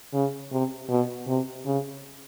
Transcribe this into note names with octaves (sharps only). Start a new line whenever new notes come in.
C#3
C3
B2
C3
C#3